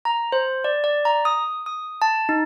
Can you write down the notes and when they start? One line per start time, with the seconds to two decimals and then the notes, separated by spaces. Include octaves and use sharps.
0.05 A#5
0.32 C5
0.64 D5
0.84 D5
1.05 A#5
1.25 D#6
1.66 D#6
2.02 A5
2.29 D#4